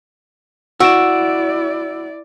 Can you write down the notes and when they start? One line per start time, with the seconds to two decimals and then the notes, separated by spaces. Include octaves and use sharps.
0.80 E4 F#4 D5 E6 D7 E7